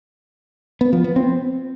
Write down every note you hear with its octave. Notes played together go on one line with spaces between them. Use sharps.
B3
F3
B3
C4